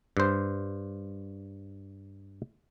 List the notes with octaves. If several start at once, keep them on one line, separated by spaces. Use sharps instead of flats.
G2 C5